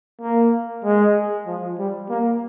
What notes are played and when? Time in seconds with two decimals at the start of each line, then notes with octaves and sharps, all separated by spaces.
0.22 A#3
0.85 G#3
1.47 F3
1.79 G3
2.10 A#3